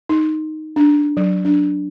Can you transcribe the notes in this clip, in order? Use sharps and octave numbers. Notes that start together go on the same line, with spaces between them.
D#4
D4
F#3
D4